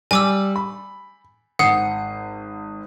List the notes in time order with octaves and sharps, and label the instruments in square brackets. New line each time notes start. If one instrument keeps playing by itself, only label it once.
[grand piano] G3 [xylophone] G#5 D6 E6
[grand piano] B5
[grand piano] G#1 D#6 C7 [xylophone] F#5